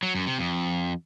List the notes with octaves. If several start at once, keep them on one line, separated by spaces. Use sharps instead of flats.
F#3
F#2
C3
F2